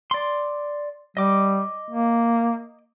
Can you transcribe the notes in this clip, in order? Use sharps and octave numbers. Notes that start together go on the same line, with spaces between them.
D5 C6
G3 D#5 D6
A#3